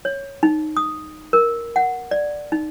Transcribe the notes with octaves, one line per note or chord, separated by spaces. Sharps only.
C#5
D#4
D#6
A#4
F#5
D5
D#4